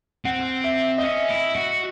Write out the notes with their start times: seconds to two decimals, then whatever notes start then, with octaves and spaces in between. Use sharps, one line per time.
0.25 C4 F#5
0.64 E5
0.98 D#5
1.03 C#4 E5
1.29 E4
1.55 F#4